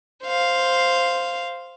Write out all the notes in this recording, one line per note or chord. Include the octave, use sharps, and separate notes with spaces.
C5 F5